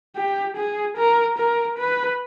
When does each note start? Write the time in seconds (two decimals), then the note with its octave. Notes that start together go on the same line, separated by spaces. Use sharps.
0.16 G4
0.57 G#4
0.97 A#4
1.38 A#4
1.79 B4